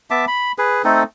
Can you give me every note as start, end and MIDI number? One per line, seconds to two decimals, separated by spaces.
0.10 0.25 59
0.10 0.25 76
0.10 0.25 81
0.10 0.25 86
0.28 0.52 83
0.58 0.82 68
0.58 0.82 71
0.84 1.03 57
0.84 1.03 60
0.84 1.03 63
0.84 1.03 69